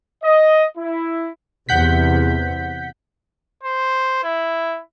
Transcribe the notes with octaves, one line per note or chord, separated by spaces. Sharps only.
D#5
E4
E2 C3 F#5 G6 B6
C5
E4